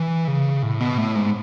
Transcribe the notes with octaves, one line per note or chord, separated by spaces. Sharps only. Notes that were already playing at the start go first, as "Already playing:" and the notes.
Already playing: E3
C#3
A2
B2
A2
G#2